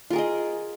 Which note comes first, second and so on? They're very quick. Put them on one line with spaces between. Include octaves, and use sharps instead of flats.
F4 A#4 G#4 D#5